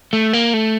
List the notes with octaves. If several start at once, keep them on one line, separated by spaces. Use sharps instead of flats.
A3
A#3
A3